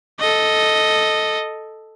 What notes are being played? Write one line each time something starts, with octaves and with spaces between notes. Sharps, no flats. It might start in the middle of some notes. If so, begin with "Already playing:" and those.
A4 D#5